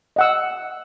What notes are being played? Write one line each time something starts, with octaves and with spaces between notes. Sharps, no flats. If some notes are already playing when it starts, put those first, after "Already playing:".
D#5 F#5 E6